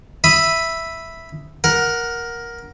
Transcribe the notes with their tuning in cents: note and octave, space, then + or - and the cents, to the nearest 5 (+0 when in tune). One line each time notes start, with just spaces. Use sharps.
E5 +0 B5 +0 D#6 +0
A#4 +10 F#5 +0